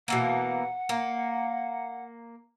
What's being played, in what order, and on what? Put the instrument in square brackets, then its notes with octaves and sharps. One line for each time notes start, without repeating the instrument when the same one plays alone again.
[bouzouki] B2 E3 A#3 [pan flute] F#5
[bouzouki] A#3